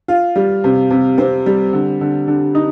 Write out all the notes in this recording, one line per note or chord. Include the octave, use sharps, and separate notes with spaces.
F4
G3
C3
C3
C4
G3
D3
D3
D3
D#4